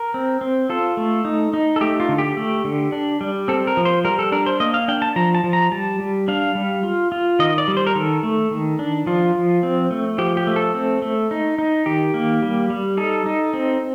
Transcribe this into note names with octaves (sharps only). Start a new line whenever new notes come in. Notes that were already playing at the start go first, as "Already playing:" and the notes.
Already playing: A#4
C4
C4
F4 A4
A3
D#4
D#4
A4
A3 G4
F4
D3
G4
A3
D3
D4
G3
C4 A4
A#4
F3
C5
G3 A#4
A4
D4 A#4
C5
A#3 D#5
F5
D4 G5
A5
F3 A#5
A5
F3
A#5
G3 A5
G3
D4 F5
G3
F4
F4
D#3 D#5
D5
G3
C5
A#4
D#3 A4
A3
D#3
D4
F3 F4
F3
C4
A3
F3 G4
G4
A3
A4
C4
A3
D#4
D#4
D#3 G4
A#3
G3
G3
D#4 A4
D#4
C4